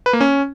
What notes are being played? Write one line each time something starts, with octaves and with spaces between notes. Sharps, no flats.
B4
A#3
C#4